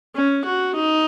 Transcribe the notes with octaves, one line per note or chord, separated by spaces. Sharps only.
C#4
F#4
D#4